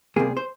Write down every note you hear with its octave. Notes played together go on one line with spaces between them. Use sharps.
C2 C3 D#3 G3 A#3 G#4
C5